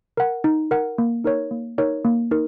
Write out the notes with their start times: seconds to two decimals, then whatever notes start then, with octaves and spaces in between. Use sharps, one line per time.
0.17 A#4 F#5
0.44 D#4
0.71 A#4 F#5
0.98 A#3
1.24 D#4 A#4 C#5
1.51 A#3
1.78 D#4 A#4 C#5
2.05 A#3
2.31 D#4 A#4